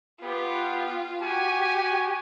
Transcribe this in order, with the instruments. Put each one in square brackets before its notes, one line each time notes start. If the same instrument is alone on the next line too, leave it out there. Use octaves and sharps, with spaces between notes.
[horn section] B3 G4 [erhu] F4
[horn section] F#4 G#5 [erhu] G4